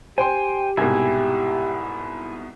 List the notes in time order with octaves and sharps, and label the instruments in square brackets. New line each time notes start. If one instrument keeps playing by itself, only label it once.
[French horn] G4 [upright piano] C5 G5 C6 [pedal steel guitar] G#5
[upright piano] C2 G#2 B2 [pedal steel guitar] E4 G#5